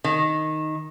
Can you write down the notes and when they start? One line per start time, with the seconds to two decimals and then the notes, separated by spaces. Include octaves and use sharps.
0.04 D#3